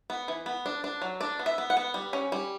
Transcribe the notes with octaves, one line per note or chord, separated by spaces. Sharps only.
B3
E3
B3
D4
D4
F#3
D4 D5
B3
E5
B3
F#5
B3
G3
C#4
G3